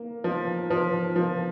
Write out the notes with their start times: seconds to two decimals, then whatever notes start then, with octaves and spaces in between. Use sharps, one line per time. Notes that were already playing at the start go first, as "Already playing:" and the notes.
Already playing: A#3
0.24 F3
0.70 F3
1.16 F3